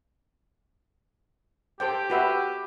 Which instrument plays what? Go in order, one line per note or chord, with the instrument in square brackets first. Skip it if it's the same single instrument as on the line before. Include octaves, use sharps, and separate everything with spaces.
[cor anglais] G4 [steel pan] A4 C5 G5
[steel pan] F#4 B4 E5